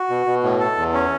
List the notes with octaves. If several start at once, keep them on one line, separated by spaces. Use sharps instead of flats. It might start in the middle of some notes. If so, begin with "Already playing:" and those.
Already playing: F#4
B2
B2
A2
A4
E2
C#4